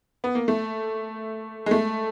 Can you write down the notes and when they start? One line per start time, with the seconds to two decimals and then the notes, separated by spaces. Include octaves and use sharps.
0.24 B3
0.35 A#3
0.48 A3
1.66 G#3
1.71 A3